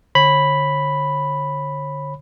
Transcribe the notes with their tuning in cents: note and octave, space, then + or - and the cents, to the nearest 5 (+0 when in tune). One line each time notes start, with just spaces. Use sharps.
D3 +0 C#5 -35 B5 +0